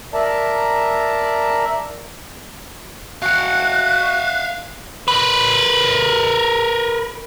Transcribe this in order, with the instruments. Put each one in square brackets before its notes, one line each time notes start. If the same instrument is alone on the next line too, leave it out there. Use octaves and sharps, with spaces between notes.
[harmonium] A#4 D5 E5 A5 A#5
[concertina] F#4 [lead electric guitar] F5 F#5 [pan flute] F#6
[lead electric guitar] A#4 B4